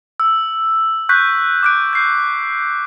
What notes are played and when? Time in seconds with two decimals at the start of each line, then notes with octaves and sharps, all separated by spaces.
0.20 E6
1.09 C#6 F#6 G6 B6
1.63 D6 F#6 D7
1.93 G6 C7